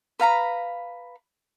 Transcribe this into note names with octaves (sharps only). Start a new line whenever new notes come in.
B4 F5 A#5 B5